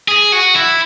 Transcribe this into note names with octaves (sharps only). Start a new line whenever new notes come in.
G#4
F#4
E4